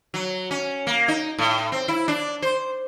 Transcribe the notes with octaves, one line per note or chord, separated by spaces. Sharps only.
F#3
C#4
A#3
D#4
A2
C4
E4
D4
C5